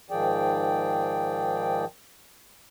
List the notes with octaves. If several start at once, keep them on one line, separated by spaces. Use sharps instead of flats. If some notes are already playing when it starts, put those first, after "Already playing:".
G#2 D#3 F3 G#4 D5 G5